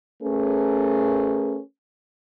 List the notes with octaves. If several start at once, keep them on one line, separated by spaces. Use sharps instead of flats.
A3 C#4 G#4 A#4 B4